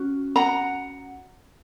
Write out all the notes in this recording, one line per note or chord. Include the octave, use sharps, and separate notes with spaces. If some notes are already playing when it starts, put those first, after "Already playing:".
Already playing: C#4 F#4
F#5 A#5